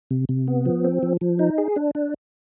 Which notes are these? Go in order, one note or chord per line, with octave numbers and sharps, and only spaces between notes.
C3
C3
B3
F3
C4
F3
F3
D#4
G#4
D4
D4